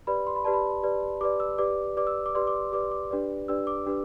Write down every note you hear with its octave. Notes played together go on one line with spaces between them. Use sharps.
G4 B4 D5 B5
C6
B5
G4 B4 D5 A5
B5
G4 B4 D5
G4 B4 D5 D6
E6
G4 B4 D5 D6
G4 B4 D5 D6
E6
D6
G4 B4 D5 C6
D6
G4 B4 D5 D6
D6
D4 G4 B4 D5
D4 G4 B4 D5 E6
D6
D4 G4 B4